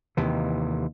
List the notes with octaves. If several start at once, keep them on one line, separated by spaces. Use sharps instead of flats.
D#2 C3 E3